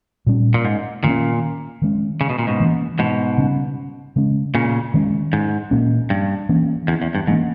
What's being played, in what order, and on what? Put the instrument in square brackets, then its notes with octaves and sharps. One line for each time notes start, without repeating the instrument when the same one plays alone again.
[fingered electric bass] A#2 G3 C#4
[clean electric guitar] A#2
G#2
[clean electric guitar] A#2 [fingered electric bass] D#3 A#3 C#4
[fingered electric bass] D#3 G#3 C#4
[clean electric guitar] C#3
B2
A#2
G#2 B2
[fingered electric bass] E3 A#3 C#4
[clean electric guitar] G#2 B2
[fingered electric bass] C#3 G3 C#4
C#3 G#3 C#4
[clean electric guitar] A#2 C#3
[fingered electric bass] D#3 G#3 C#4
[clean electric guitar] G#2
[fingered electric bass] A#2 A#3 C#4
[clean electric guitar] G2
[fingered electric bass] E3 A#3 C#4
[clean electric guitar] E2
E2
G2
[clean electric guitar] G#2 [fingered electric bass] E3 A#3 C#4